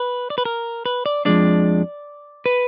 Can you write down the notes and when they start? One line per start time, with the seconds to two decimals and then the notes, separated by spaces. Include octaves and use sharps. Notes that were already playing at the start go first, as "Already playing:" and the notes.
Already playing: B4
0.30 D5
0.38 B4
0.45 A#4
0.86 B4
1.06 D5
1.25 F2 F3 G#3 D4 D5
2.46 B4